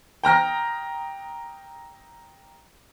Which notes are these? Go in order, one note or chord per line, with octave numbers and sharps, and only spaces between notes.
G5 A#5 F6 A#6